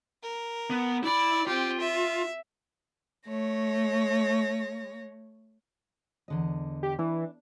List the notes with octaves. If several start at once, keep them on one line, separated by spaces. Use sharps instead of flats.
A#4
B3
E4 D5 B5
C4 F4 G4
E5
A3 C#5 A#6
E2 D3 D#5
G4
E3 D4